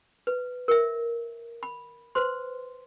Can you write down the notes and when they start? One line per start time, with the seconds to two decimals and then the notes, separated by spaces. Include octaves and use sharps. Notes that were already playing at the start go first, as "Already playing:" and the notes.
0.27 B4
0.68 A#4 E5
1.63 B5
2.15 B4 C5 C6